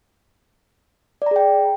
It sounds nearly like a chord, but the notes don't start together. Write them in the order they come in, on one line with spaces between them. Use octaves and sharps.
D5 A#5 G#4 G5